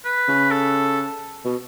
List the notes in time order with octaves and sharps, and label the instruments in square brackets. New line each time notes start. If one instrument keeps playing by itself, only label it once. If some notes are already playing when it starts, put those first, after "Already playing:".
[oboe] B4
[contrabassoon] C#3
[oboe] A4
[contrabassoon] B2